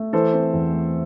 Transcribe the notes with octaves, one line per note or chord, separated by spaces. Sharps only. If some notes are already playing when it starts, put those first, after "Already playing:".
Already playing: A3
E3 A4 C5
C4
E2
A3